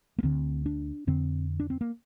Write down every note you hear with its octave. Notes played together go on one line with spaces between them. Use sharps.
A#3
D2 D3 C4
D4
F2 D3 C4
D4
C4
A#3